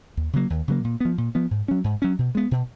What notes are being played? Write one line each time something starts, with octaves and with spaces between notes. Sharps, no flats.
D#2
C#3 F#3 A#3
D#2
C#3 F#3 A#3
A#2
F3 B3
A#2
F3 B3
G#2
F#3 C#4
G#2
F#3 C#4
B2
G#3 B3
B2